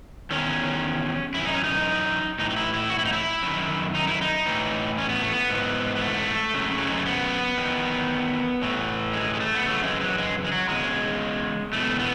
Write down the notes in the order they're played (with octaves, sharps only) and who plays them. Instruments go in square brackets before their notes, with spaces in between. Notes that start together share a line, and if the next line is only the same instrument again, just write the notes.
[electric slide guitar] E2 D#3 C#4
F#2 E3 E4
D#4
C#4
D#4
A2 E3 D#4
D#4
E4
E4
F#4
E4
D#4
E4
F#2 D#3
D#4
E4
D#4
A2 E3
C#4
B3
A3
B3
G#2 E3
B3
A3
F#2 C#3
F#3
G#3
A3
B3
E2 D#3
A2 E3
G#3
G#3
A3
B3
F#2 C#3 E3 A3
G#3
F#3
G#3
G#3
F#3
E2 C#3 G#3
E2 B2 A3
B3